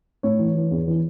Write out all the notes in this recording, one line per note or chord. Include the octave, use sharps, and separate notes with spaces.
A2 C#5
E3
E3
E2
E3